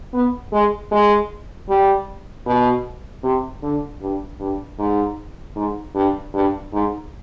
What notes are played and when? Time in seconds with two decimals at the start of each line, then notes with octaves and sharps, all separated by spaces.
0.13 B3
0.52 G#3
0.91 G#3
1.69 G3
2.46 B2
3.23 C3
3.62 D3
4.01 G2
4.40 G2
4.79 G#2
5.56 G#2
5.95 G2
6.33 G2
6.73 G#2